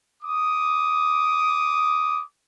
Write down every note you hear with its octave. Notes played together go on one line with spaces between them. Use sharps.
D6 D#6